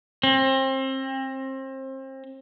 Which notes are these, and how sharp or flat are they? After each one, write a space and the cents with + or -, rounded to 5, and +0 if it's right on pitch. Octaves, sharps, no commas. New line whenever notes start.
C4 +30